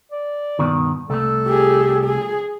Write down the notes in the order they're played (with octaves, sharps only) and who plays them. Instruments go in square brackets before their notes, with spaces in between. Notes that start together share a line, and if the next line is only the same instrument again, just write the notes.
[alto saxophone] D5
[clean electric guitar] G2 B2 D#3
[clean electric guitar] C2 A3 [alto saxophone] A4
[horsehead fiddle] G4 G#4
G#4